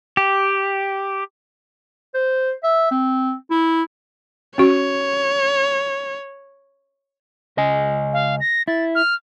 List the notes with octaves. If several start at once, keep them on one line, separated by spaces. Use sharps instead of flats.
G4
C5
E5
C4
E4
C#4 F#4 C#5
C#2 D#5 G#5
F5
A#6
E4 A6
F6